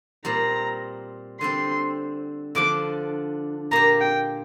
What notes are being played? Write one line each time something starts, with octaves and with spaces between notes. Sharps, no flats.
A#2 G3 C4 A#5
D3 G3 C4 C6
D3 F3 D4 D6
A#2 A#3 G4 A#5
G5